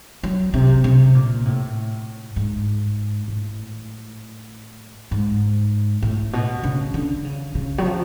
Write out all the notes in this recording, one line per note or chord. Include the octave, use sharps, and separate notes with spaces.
F#3
C3
C3
A#2
A2
G#2
A2
G#2
A2
B2
C#3
D3
C#3
C#3
F#3
F3